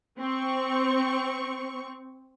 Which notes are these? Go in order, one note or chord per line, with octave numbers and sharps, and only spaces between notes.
C4 C#6